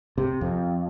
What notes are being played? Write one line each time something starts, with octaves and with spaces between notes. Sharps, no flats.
C3
F2